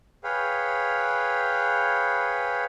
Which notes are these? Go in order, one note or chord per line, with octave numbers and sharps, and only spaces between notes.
G#4 B4 C#5 F5 G5